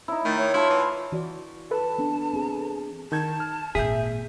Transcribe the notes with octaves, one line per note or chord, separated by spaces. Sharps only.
D#4 E4
D#3 A3
C#5
E4 F4 E5 A5
E3
E3 F#4 D5
A4 B4 A5
B3 D4
C4 G#4
D#3 A5 G6 G#6
F6
G#1 A#2 G#4 E5 G6 B6